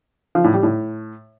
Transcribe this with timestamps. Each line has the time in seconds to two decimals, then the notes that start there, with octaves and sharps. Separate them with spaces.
0.35 F3
0.44 A2
0.54 G3
0.63 A2